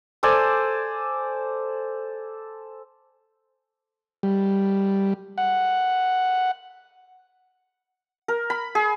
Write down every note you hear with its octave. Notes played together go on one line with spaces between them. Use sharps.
A4 C5 D5 G#5
G3
F#5
A#4
B5
G#4